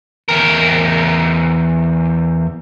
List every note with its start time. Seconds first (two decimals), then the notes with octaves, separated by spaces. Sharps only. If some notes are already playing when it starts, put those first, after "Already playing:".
0.29 E2 A#4